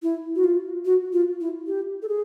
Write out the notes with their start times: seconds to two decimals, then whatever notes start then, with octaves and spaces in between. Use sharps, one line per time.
0.03 E4
0.35 F#4
0.44 F4
0.85 F#4
1.13 F4
1.40 E4
1.67 G4
2.02 A4
2.08 G#4